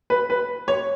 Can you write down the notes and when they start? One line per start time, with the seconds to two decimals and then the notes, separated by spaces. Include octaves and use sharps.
0.10 B4
0.30 B4
0.68 C#5